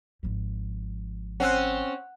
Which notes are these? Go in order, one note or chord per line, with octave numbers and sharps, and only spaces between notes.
G#1 F3
C4 C#4 F#5 F#6